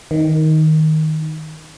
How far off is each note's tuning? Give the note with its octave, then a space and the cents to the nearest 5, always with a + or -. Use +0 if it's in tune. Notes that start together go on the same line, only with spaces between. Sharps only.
D#3 +5